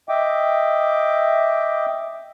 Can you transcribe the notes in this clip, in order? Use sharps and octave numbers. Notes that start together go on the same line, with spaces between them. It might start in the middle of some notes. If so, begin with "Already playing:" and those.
D#5 E5 G5 D6